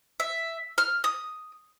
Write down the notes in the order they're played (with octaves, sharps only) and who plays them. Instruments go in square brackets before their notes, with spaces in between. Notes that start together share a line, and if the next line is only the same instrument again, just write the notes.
[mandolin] E5
F6
D#6